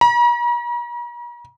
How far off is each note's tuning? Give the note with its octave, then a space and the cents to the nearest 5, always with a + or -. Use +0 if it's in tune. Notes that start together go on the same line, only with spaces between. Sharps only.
A#5 +45